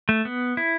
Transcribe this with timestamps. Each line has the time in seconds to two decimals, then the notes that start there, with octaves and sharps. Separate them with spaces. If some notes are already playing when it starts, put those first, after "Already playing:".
0.09 A3
0.25 B3
0.57 E4